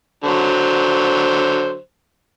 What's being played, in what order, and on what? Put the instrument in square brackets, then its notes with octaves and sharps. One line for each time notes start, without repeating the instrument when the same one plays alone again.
[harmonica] D3 F#3 C5